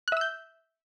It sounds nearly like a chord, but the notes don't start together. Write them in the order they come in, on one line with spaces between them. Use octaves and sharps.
F#6 E5 E6 G6